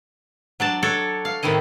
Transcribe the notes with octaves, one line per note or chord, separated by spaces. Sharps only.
F#3 D4 A5
D4 A4 C#5
F5
A2 C3 D#3 E4 D#5